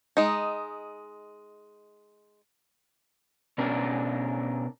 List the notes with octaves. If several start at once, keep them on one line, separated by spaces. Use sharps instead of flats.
G#3 D#4
B2 C#4 D4 A#4